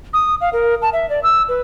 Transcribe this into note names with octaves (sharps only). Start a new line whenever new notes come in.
D#6
F5
A#4
A5
E5
D5
E6
B4